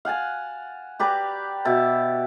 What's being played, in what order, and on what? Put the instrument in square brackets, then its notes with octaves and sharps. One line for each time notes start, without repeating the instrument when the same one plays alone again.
[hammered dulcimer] F5 F#5 G#5 A5
G4 B4 D5 A#5
B2 E5 A5